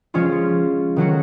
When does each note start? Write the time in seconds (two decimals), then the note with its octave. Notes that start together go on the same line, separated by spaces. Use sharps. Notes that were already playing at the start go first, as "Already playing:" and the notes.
0.14 F3 G#3 C#4 F4
0.96 D#3 F#3 C#4 F#4